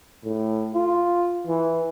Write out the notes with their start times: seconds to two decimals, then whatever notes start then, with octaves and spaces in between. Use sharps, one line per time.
0.25 A2
0.74 F4
1.47 E3